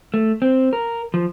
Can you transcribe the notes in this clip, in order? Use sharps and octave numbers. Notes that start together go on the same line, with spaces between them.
A3
C4
A#4
F3